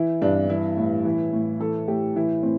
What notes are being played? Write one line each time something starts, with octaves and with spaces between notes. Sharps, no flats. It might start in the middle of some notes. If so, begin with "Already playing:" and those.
Already playing: E3 E4
G2 D4
E3 E4
A2
E3
A2
E3 A4
A2 G4
E3 E4
A2 C4